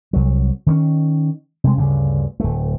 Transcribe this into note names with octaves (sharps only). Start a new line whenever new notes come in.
C2 F#3
D#3 C4 C#4
C3 G#3
D2 G2 C#3
D1 A3